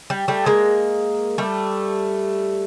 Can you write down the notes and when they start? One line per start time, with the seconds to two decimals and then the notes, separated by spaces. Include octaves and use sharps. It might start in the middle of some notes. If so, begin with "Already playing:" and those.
0.10 G3
0.28 G3 A3
0.46 G#3 A#3
1.38 G3 A3